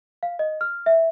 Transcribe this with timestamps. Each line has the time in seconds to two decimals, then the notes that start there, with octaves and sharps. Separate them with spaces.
0.23 F5
0.39 D#5
0.61 F6
0.86 E5